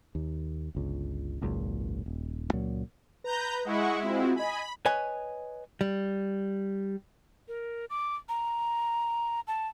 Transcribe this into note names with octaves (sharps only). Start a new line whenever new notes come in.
D#2
G1 C#2
G#1 C#2 F#2 A#2
D#1
C#2 A#2 F#3
B4 A#5 G6
G#3 E4 D#5 F#5 C#6
C4 F4 F#4
D#5 G#5 B5
B4 C#5 D#5 G#5
G3
A#4
D6
A#5
A5